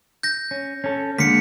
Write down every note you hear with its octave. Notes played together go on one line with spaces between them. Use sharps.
G6 A#6
C#4
C#4 A4
D3 G#3 A#3 B6 C#7